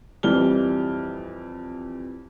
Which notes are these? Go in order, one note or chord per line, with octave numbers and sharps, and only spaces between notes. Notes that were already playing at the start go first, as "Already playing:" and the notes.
F2 E3 G3 F6 G7